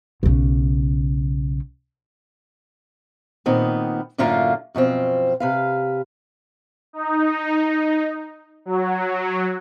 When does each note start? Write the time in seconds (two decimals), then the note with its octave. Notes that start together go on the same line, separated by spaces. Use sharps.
0.23 B1 C#3
3.46 A#2 D#3 B3 C4
4.18 F#2 A2 D3 A3 A#3 F4
4.75 F#2 B2 F3 C4
5.40 C3 B4 F5
6.93 D#4
8.65 F#3